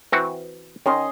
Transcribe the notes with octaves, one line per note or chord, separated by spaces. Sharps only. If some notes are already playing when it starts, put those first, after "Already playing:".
E3 C4 F#4
D#3 C#4 D#5 C6